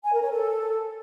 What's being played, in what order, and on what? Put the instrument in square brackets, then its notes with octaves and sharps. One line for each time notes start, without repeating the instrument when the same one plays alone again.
[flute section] G#5
A#4
C#5
A4